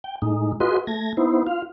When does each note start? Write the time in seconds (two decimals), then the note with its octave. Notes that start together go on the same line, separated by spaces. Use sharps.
0.04 G5
0.22 A2 G#3 D#4
0.60 F4 F#4 G#4 B4 D#5 C6
0.87 A3 G#6 A#6
1.17 B3 D#4 E4 C5
1.47 F4 F5